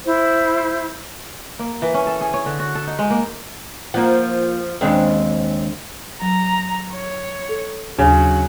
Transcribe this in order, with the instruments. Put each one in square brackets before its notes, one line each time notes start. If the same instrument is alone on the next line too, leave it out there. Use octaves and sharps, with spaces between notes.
[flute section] E4 C5
[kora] A#3
E3
C#4
A4
G#4
C#5
D3
F#4
A4
D#4
G#3
A#3
[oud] F3 [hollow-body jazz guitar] A#3 F#5
[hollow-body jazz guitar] D#2 C#3 G#3 [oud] C4 D4
[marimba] F#3 [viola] A#5
[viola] C#5
[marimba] A4
[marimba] D#2 D4 [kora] C#3 [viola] F#3